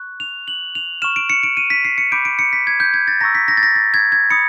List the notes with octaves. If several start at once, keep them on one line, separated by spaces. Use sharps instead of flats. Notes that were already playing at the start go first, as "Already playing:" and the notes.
Already playing: C#6 F#6
F7
F#7
F7
C#6 F6 E7
D7
C#7
D7
D#7
B6
C7
C#7
B5 D6 G6 D7
D7
C#7
B6
G#6
G6
G#6
A6
A#5 C#6 E6 A#6
B6
A#6
A6
A#6
A6
G#6
G#6
B5 D#6 C#7